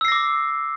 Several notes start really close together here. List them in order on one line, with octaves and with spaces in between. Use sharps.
E6 C7 A#6 D6